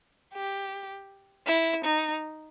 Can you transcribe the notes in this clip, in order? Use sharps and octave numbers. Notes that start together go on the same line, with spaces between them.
G4
E4
D#4